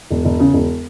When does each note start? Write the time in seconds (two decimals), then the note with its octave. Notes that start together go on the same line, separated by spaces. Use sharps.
0.10 E1
0.25 E1
0.40 C#3
0.54 E1